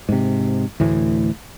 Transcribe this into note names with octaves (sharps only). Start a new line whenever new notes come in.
G#2 C3
D2 A2 E3